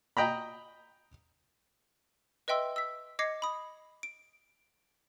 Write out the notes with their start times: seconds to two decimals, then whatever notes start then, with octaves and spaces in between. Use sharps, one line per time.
0.17 D#5 G5 A#5 B5
2.48 B4 D#5 E5 G5 C6 E6
2.76 E6 B6
3.19 D#5 D6 G#6 A#6 C7 C#7
3.42 B5 D#6
4.03 D7